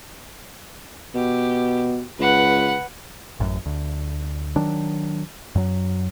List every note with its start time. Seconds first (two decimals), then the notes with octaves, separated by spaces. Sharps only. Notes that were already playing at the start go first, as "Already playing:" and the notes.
1.15 B2 G4
2.19 C#2 B4 F#5
3.40 A1 F#2
3.66 D2
4.56 D#3 F#3 D4
5.55 F#2 F#3